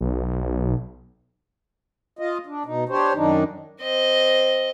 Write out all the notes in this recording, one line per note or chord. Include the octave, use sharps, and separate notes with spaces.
B1
F4 D#5
D4
B2 D#4
D4 G4 C5 C#5
F#2 D#3 D4 D#4
C4 D#5